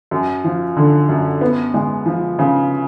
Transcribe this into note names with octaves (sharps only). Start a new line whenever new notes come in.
F#2
F3
D3
F#2
B3
G#3
F3
C#3